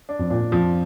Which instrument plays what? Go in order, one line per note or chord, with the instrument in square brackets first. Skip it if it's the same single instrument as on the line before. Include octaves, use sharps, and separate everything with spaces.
[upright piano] D4
[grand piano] F2
[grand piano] A#2 [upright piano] D4
[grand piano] A#2
[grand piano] F2 [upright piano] F3